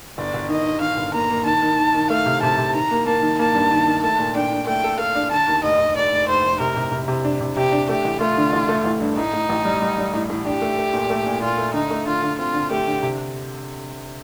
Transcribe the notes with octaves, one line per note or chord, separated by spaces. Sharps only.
G1 D5
G1
D#3 D#5
D#3
D#3 F5
G1
A#3 A#5
A#3
D#3 A5
D#3
D#3
D#3
A3 F5
C3
C3 A5
C3
D#3 A#5
A#3
A#3 A5
D#3
A#3 A5
G2
D#3
D#3
A3 A5
A#2
D4 G5
D4
A3 G5
A4
A4 F5
D4
D3 A5
D#2
F1 D#5
F1
F1 D5
F1
F1 C5
F1
C3 A#4
C3
C3
C3
D4
C3
C3 G4
D4
A3 G4
A1
A3 F4
D3
A1
A3
A1
G2
A2 D#4
A2
A1
G3
G3
G3
A2
A2
D4 G4
A3
A3
A#2
A3
A#2
A#2 F4
A3
D3 D#4
A3
D3 F4
D3
C4 F4
D3
A3 G4
D3
C3